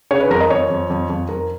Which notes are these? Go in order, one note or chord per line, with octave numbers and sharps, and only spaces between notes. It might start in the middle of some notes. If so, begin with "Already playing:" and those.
C#3 C#5
B4
F2 A#4
D#5
F2 C#5
F2
F2
F2
F2 A#4